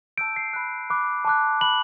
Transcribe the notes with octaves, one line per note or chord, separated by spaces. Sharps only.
A5 E6 G6 D7
C7
B5 F#6
B5 D6 F#6
A5 D6 F#6
B5 F#6 F#7